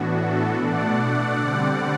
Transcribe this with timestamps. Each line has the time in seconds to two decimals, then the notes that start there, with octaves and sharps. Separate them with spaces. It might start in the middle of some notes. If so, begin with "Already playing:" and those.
Already playing: A2 E3 B3 D4 F#4
0.14 F#4 A4
0.55 B2 A3 D4 D5 F#5
1.39 D3 G3 C4